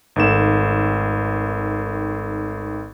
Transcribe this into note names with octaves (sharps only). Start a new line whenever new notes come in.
G#1 D#3 A3 E7